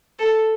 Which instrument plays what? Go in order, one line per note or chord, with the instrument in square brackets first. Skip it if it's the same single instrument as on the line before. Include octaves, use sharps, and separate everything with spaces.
[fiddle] A4